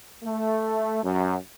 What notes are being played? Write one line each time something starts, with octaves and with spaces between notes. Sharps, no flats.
A3
F#2